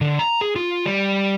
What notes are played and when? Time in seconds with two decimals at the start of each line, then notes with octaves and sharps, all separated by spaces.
0.01 D3
0.19 A#5
0.41 G#4
0.56 F4
0.86 G3